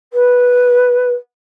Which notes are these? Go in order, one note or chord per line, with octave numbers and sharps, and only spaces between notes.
B4